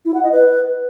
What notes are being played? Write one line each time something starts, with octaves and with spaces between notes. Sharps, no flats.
E4
F#5
D#5
B4